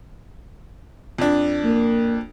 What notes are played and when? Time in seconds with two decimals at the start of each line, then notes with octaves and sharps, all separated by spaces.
1.18 F2 D4
1.64 A#3